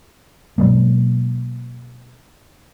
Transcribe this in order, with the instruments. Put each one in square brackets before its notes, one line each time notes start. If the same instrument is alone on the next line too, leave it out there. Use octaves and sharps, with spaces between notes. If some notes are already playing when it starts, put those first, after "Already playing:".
[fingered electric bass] B2 F#3 G#3 A#3